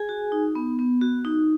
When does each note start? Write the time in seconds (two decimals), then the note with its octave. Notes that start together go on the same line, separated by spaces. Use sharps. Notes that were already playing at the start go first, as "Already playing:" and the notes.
Already playing: G#4 G#5
0.09 F#4
0.32 D#4
0.55 B3
0.79 B3
1.01 F#4
1.25 D#4